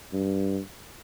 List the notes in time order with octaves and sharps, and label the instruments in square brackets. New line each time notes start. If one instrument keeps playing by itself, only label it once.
[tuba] G2